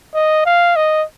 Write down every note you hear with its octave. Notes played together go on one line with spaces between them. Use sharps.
D#5
F5
D#5